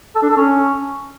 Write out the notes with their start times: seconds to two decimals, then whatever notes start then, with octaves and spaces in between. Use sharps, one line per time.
0.15 A4
0.22 D4
0.30 A4
0.37 C#4